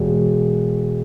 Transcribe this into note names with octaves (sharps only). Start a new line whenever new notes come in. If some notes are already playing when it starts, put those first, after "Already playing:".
Already playing: E1